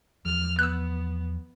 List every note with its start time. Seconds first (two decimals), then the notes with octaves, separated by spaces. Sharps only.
0.25 E2 F3 F6
0.59 B3 E6 F#6